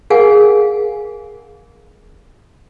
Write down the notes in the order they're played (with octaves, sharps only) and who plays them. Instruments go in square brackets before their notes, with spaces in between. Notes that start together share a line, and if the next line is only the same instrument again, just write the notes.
[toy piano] G#4 A#4 F5 F#5 G#5